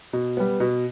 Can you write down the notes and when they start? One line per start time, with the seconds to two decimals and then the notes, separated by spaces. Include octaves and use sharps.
0.13 B2
0.37 G3 B3
0.60 B2